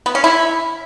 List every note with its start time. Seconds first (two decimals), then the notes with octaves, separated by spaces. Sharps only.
0.06 B3
0.15 C#4
0.24 E4